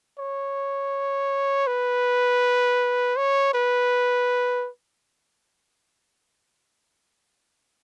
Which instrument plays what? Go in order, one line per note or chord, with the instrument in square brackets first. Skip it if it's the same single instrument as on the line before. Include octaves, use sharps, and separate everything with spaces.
[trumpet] C#5
B4
C#5
B4